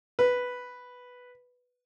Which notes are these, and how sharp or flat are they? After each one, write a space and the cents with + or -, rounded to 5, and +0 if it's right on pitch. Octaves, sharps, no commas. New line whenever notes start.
B4 +0